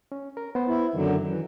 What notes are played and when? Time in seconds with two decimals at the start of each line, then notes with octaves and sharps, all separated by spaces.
0.12 C#4
0.37 A#4
0.55 B3 C5
0.68 E4
0.95 F#2 D3 D#3 F#3
1.27 E3